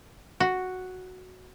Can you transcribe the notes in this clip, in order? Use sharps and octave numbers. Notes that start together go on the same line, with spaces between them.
F#4